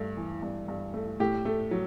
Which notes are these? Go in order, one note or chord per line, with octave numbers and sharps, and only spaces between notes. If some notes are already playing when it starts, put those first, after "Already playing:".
Already playing: G2 A3
E3
G2
G2
A3
A2 G4
A3
F#3